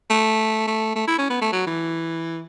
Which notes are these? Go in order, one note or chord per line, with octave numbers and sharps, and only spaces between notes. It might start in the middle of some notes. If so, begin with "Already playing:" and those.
A3
A3
A3
E4
C#4
B3
A3
F#3
E3